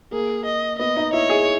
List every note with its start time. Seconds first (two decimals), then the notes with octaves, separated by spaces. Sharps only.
0.12 A#3 G#4
0.46 D#5
0.79 B3 D#5
0.96 D#4
1.13 E4 C#5
1.30 G#4